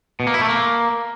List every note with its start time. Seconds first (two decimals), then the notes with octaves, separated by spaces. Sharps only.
0.20 B2
0.27 A#3
0.34 E4
0.41 A3
0.48 A#3